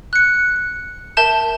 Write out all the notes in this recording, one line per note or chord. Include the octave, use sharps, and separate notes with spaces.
F#6 C#7
A#4 E5 A5 G6 E7